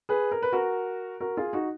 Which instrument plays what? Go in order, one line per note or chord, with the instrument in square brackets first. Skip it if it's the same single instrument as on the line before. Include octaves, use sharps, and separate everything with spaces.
[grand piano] G#4 B4
A#4
B4
F#4 A#4
F#4 A#4
F4 G#4
D#4 F#4